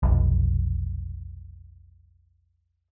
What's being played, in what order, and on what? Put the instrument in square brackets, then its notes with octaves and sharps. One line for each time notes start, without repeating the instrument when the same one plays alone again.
[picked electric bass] F1 B1